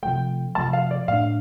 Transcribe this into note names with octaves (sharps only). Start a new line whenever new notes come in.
C3 F3 A3 G5
C3 F3 A3 A5
F5
D5
A2 A3 D4 F5